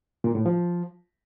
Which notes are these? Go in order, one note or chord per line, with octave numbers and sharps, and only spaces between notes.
A#2
A2
F3